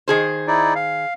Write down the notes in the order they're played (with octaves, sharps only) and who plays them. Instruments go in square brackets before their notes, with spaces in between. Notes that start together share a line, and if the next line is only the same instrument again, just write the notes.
[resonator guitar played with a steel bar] D#3 G#4 C5
[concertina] D#4 E4 D5
F5